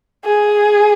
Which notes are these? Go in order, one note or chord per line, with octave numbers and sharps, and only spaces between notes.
G#4